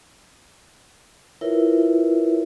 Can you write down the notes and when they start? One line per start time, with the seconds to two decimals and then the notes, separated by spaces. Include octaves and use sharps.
1.41 E4 F4 A#4 B4 C#5 E5